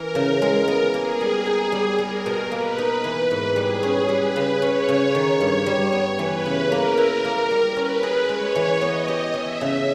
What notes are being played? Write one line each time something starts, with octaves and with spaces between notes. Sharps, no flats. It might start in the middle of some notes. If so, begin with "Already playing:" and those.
Already playing: E3 A#4
C#3
G#3
B3
A#3 G#4
G3
D#4
G3
G3 A#4
B2
A#3 B4
D#4
E3
G#2
G3 G#4
C#4
G3 B4
C#3
C#4 C#5
C#3
D#3
G2
G3
B3
E3 B4
C#3
A#3 A#4
E4
A#3
G3
C#4 B4
G#4
G#3 C#5
E3
B3 D#5
G4
E3 E5
C#3